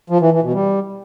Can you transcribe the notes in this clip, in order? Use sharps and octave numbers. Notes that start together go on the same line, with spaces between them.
F3
E3
E3
B2
G3